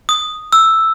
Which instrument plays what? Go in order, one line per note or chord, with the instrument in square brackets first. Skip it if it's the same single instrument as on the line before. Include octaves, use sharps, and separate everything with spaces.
[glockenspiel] D#6
E6